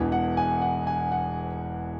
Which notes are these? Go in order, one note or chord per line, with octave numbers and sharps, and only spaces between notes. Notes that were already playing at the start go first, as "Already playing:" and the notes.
Already playing: E1 E2 E3
F#5
G#5
F#5
G#5
F#5